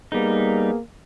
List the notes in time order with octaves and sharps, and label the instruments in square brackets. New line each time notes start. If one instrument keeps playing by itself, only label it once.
[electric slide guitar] G3 D#4 [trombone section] A#3 B3 G#4